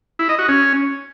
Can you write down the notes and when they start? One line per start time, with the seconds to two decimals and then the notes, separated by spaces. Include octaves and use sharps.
0.19 E4
0.29 D#5
0.39 F#4
0.48 C#4